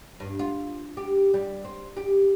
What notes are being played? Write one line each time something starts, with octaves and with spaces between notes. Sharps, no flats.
G2
F4
G4
G3
C4
G4